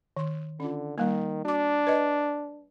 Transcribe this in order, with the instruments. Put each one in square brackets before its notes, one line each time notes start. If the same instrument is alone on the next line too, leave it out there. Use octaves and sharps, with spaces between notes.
[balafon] D#3 C6
[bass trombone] D3 [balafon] C#4 F4
[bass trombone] D#3 [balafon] G3 A#3
[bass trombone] D4 [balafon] F#4 D6
[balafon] B4 D#5